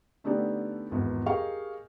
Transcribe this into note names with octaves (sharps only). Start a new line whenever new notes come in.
D3 A3 B3 D#4 G4 D5
G#1 E2 B3 B4
G4 G#4 A#4 D#5 F5 C#6